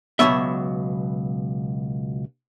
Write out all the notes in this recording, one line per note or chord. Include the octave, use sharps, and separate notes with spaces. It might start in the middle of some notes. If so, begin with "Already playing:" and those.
C#2 F#2 B2 F#3 B3 E5